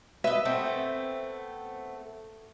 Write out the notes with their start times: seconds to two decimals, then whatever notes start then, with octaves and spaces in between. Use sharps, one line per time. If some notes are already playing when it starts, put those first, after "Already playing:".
0.24 B4 D#5 E5
0.45 A3 B3 C4